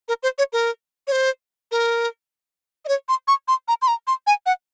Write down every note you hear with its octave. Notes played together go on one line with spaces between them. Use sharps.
A#4
C5
C#5
A#4
C#5
C5
A#4
D#5
C#5
C6
C#6
C6
A#5
C6
A#5
C6
G#5
F#5